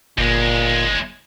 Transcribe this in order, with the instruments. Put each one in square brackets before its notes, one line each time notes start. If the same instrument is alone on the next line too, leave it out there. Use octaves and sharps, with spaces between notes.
[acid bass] G1 [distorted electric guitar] D#2 G#3 [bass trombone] A#2